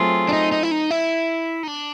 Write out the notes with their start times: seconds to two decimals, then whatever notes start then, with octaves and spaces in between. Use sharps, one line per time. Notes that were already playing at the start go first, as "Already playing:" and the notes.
Already playing: F#3 A3 C4 F4 G#4
0.29 D4
0.33 D#4
0.52 D#4
0.63 E4
0.71 D#4
0.91 E4
1.63 D#4
1.68 D4